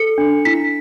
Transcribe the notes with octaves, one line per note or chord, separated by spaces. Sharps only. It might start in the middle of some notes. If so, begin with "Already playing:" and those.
Already playing: A4 C#7
D4
E4 B6